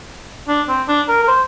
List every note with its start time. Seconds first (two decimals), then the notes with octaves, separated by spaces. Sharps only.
0.48 D4
0.69 C4
0.88 D4
1.09 A#4
1.23 A#4
1.28 C5